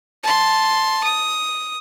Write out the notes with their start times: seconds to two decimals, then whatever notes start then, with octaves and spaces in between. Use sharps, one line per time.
0.24 A5 C6
1.04 D#6